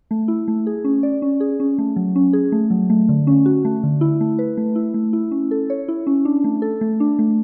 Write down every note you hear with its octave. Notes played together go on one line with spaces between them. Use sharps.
A3
E4
A3
G#4
C#4
D5
C#4
G#4
C#4
A3
F#3
C#4
G#4
A3
F#3
A3
D3
C#4
F#4
A3
D3
E4
A3
B4
A3
E4
A3
E4
C#4
A4
C#5
E4
C#4
D4
A3
A4
A3
D4
A3